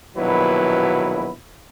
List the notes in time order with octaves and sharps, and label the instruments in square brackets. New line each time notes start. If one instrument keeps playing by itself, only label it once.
[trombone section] A#1 D#2 B2 F#3 E4 B4